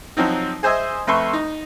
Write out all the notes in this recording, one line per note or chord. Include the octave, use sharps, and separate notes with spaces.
F3 F#3 C4 D#4
G#4 C5 D#5 E5 G#5
F2 A3 B4 E5 C6 C#6
D#4